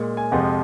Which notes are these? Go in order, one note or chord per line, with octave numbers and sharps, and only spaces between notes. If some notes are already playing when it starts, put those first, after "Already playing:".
Already playing: A#2 G#3
G#5
F2 C3 F3 G#3 F#5